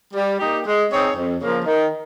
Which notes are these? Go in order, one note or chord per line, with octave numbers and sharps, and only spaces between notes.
G3
A#3 D#4 G4
G#3
C4 D#4 G#4 C#5
F2
C#3 F3 A#3
D#3